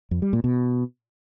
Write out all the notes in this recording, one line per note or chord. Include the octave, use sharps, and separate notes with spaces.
F2
G3
A#2
B2